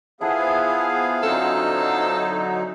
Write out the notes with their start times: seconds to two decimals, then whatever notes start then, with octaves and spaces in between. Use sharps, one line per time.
0.21 B3 E4 F4 G#4 A4 C5 F5
1.23 D3 F#3 C4 D#4 A4 F#5 G#5